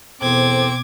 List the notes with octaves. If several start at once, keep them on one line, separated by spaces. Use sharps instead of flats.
E2 B2 B3 C4 A4 C5 D6 G#6